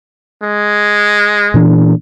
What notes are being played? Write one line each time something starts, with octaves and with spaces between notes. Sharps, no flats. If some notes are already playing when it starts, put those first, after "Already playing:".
G#3
A#2 E3 D4